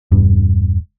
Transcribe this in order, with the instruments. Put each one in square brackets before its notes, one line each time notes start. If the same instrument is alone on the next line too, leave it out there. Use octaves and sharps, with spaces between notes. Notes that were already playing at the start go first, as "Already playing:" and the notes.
[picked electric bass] E1 G2